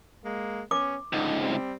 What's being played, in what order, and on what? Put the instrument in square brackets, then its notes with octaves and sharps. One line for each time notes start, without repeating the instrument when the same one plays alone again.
[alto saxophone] G#3 [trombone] A#3
[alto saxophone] B3 [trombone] C#4 [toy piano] D6
[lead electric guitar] C#2 G#2 [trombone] D3 [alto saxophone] D#4
[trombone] G3 [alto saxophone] C4